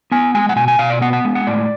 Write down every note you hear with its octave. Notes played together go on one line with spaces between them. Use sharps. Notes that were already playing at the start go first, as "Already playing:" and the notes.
B3 G#5
G#3 G#5
F#5
B2 G#5
G#5
B2 F5
D5
B3 F#5
F#5
G#3
F#5
A2 D5